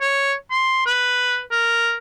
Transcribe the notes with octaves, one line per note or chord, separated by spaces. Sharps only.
C#5
C6
B4
A#4